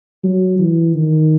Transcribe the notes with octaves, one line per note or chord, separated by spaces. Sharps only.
F#3
E3
D#3